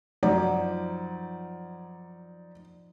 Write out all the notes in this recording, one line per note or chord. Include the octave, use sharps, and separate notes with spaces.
F#2 F3 D#4 D5